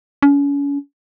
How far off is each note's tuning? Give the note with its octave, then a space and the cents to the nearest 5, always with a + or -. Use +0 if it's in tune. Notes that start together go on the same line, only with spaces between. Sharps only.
C#4 +35